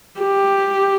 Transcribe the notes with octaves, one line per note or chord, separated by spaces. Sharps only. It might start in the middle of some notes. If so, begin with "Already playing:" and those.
G4